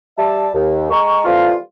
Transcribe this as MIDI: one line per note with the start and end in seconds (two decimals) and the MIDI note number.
0.18 0.48 55
0.18 0.48 76
0.18 0.48 81
0.54 0.88 39
0.91 1.23 56
0.91 1.23 82
0.91 1.23 85
1.25 1.55 52
1.25 1.55 55
1.25 1.55 57
1.25 1.55 60
1.25 1.55 65